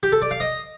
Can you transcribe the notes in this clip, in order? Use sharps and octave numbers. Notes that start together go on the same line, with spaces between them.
G4
A4
D5
F5
D#5